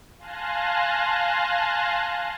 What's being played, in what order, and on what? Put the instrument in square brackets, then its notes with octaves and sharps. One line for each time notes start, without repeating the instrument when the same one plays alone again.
[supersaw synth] F5 G#5 A5 C6 F#6 A#6